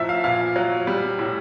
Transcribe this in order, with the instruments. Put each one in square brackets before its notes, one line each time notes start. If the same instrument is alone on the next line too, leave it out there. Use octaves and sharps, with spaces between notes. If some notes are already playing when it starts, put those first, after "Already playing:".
Already playing: [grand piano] F#2 A2 F3 E5
F5
A#2 F5
F#3
G3
A2